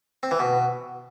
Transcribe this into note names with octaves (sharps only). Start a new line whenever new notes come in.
C4
E3
B2